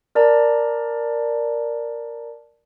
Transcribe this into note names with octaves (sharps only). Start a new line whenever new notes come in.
A#4 D5 A5 A#5